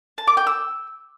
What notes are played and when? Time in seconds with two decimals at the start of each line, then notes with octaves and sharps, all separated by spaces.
0.18 A5
0.27 D6
0.37 G5
0.47 E6